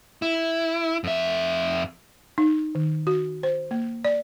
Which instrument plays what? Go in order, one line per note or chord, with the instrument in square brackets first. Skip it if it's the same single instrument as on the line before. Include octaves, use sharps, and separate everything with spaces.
[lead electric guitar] E4
F2 E5
[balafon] D#4
D#3
F#4
C5
A#3
D5